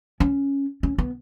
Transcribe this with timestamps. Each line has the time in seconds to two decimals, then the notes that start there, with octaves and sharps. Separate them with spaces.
0.20 C#4
0.83 C#4
0.98 B3